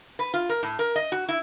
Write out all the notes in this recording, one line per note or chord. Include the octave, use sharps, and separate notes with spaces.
B4
F4
A#4
A2
A#4
D#5
F#4
E4